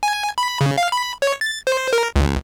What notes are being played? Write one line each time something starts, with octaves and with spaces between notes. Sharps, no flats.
G#5
B5
C#3
F5
B5
C#5
A6
C5
A#4
C#2